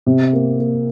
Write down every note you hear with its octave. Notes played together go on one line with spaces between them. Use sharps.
C3
A#3
A#3